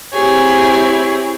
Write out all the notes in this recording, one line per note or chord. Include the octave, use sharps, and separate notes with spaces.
C4 E4 G4 G#4 C#5